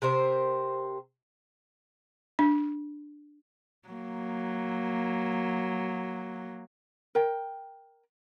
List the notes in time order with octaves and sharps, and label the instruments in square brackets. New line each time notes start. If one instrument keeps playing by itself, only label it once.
[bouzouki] C3 A#4 C5
[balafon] D4
[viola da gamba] F#3 A#3
[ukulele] A#4 G5